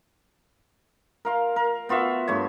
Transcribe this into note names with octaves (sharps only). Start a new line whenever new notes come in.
A#4 F5 C6
A#4
B3 F4 F#4 E5
G2 A3 C#5